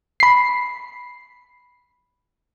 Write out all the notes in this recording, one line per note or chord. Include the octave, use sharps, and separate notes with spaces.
B5 C7